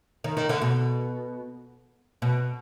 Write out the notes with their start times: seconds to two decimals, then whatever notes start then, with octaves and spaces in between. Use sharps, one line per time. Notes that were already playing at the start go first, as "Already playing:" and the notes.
0.24 D#3
0.37 D#3
0.49 D3
0.61 B2
2.22 B2